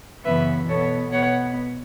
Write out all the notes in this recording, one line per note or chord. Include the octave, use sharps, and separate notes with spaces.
F#2 C#3 E3 B3 B4 E5
B2 B3 A4 C#5
B2 B3 C#5 F#5